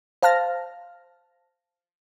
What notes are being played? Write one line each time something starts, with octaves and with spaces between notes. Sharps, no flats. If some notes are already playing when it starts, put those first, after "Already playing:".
C5 F5 A5 F6 A#6